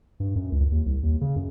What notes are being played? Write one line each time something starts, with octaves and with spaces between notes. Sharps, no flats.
G2
F#2
C#2
D#2
C2
D#2
C#3
F#2